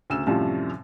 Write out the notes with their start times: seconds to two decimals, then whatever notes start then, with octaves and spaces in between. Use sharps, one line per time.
0.10 D2 C#3 E6 E7
0.27 F#2 A2 C3 F3 G3 F4